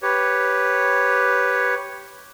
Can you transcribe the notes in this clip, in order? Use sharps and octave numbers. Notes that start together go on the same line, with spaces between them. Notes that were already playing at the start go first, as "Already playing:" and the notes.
G4 B4 C#5